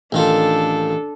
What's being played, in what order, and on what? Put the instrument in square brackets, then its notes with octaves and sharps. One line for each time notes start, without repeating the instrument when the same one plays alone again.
[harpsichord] A1 D#3 F4 [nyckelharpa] D4 A4